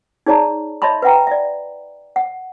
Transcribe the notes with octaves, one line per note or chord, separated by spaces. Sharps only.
D#4 G#4 C#5 D5 A5 A#5
C#5 D#5 E5 A5 B5 C6
B4 E5 F#5 G5 A#5
D5 E5
F#5